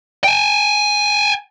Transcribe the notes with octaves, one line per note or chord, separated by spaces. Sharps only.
G5 G#5